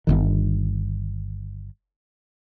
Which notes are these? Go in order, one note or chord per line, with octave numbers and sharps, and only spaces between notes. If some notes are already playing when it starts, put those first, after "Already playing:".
G1 C2 D#3